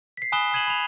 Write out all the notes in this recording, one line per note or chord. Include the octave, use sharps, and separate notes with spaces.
B6 C7
G#5 B5 D#6 F#6 E7 G7
G#5 D#6 G#6 D#7 E7 F#7
B5 F7